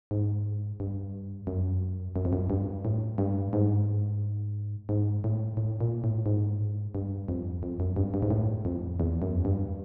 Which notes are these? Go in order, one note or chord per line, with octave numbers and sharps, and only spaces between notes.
G#2
G2
F#2
F#2
F2
F#2
G2
A2
G2
G#2
G#2
A2
A2
A#2
A2
G#2
G2
F2
F2
F#2
G2
G2
G#2
A2
F2
E2
F#2
G2